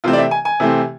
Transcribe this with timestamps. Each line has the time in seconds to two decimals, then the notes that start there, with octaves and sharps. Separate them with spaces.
0.04 C3 E3 A3 C4 F4
0.13 D5
0.18 E5
0.31 G#5
0.45 G#5
0.60 C3 E3 A3 C4